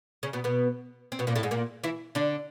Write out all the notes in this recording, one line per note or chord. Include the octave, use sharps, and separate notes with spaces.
C#3 C#4
B2 B3
B2 B3
C4
B2 B3
A#2 A#3
A2 A3
G#2 G#3
A#2 A#3
E3 E4
D3 D4